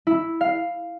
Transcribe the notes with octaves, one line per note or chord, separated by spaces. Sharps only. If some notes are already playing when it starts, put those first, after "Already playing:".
E4
F5